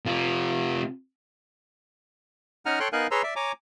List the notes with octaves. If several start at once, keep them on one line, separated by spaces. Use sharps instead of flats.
C3 F4
C#4 D#4 F#5 G#5 A#5 F6
A4 C#5 G5 C6 F#6
B3 D#4 A#4 F5 G#5 F#6
G#4 B4 C#5 A#5 C6 E6
D5 E5
C#5 G#5 A#5 D6